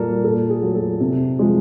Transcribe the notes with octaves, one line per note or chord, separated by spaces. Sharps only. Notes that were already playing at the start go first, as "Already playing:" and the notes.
Already playing: A#2 G3 A4 A#4
A#2 A4
G#4
F#3 A3
A4
C3
F3 G#3